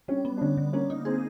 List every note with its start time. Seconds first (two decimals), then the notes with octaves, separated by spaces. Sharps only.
0.08 G3 C#4
0.25 B3
0.37 D4
0.41 D3 C#4
0.57 D3
0.73 A#3 C#4
0.90 D#4
1.05 C4 G#4